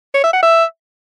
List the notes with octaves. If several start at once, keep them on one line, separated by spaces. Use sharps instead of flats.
C#5
E5
F#5
E5